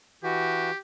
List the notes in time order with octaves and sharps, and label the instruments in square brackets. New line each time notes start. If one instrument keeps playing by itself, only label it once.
[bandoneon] E3 F#4 [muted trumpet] G4